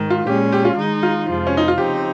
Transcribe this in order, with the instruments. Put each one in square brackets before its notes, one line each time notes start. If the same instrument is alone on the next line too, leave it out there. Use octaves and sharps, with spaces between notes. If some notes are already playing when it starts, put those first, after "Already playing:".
Already playing: [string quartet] G#2 D#3
[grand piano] F4
[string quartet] A#2 G#3 C#4 [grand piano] G4
[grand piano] G4
F4
[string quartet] D#3 G#3 D#4
[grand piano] F4
[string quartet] F2 C3 F3 G#3
[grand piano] C#4
D#4
F4
[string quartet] C#3 F3 C4 D#4 [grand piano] G4